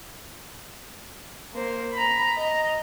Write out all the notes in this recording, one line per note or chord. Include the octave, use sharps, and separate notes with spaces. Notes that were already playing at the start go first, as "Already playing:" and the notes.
A#3 C5
A#5 B5
D#5 A#5